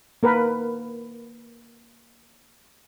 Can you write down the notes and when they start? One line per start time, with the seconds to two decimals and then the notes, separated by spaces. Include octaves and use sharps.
0.23 A#3 A#4 B4